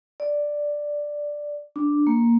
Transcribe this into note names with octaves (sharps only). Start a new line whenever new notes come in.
D5
D4
A#3